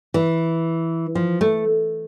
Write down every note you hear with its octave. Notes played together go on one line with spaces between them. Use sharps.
E3
F3
A3